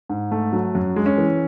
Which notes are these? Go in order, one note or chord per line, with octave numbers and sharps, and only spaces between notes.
G#2
A3
F#3
F#2
G#3
C#4
E3